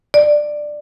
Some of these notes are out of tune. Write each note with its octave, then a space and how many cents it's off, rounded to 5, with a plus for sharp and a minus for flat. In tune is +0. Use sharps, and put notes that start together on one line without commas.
D5 +15